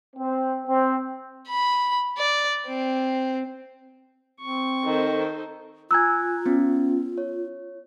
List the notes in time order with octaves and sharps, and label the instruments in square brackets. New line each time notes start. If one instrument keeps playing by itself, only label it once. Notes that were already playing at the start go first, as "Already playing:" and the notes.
[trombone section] C4
C4
[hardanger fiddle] B5
D5
C4
[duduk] C4 [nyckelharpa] C#6
[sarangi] D#3 [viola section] D#4 A4 C5
[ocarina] F4 [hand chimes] G#5 A#5 F#6 [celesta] E6 G#6
[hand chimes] B3 C#4
C#5